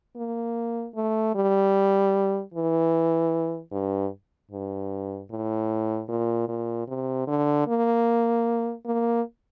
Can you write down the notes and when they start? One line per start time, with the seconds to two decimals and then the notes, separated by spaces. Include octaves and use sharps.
0.16 A#3
0.95 A3
1.35 G3
2.54 E3
3.72 G2
4.51 G2
5.31 A2
6.09 A#2
6.48 A#2
6.88 C3
7.27 D3
7.67 A#3
8.86 A#3